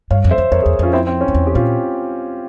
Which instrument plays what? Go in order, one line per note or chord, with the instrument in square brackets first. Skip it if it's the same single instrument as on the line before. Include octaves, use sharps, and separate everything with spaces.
[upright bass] G2 [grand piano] C#5 F5
[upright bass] F2
[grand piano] C5 E5
[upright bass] F2
[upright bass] F2 [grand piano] A#4 C#5
[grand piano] G#4 C5
[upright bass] E2
[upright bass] F2 [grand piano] C#4 F4
[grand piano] C4 E4
C4
C#4
[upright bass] F2
E2
[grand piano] G4
[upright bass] A#2 [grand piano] C#4 F4